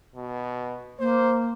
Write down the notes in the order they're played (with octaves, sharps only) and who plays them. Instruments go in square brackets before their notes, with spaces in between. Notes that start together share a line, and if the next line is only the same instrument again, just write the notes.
[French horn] B2
[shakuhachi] A#3 [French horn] C5